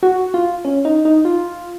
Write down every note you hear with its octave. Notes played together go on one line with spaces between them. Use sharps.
F#4
F4
C#4
D#4
D#4
F4